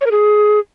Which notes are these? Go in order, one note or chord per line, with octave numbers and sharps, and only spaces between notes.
C#5
A#4
G#4